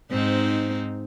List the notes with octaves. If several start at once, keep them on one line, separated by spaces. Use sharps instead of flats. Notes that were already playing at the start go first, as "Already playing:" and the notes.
G#2 C4 D#4